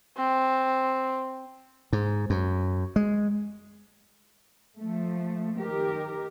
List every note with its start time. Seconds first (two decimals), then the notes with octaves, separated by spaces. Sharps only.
0.17 C4
1.93 G#2
2.30 F#2
2.96 G#3
4.78 F3 A3
5.60 D#3 G4 A#4